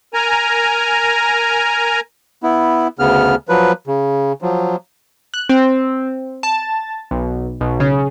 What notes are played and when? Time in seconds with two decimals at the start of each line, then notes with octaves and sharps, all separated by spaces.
0.14 A#4 G#5 A#5
2.43 B3 E4
2.99 D2 C#3 B3 F6
3.49 F3 F#3 B4
3.87 C#3
4.42 F3 F#3
5.34 F#6
5.49 C4
6.43 A5
7.11 B1
7.61 B1
7.80 C#3